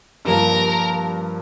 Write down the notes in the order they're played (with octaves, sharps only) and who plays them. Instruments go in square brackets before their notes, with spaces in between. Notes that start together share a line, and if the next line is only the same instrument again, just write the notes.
[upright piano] G2 F3 A#3 [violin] A#4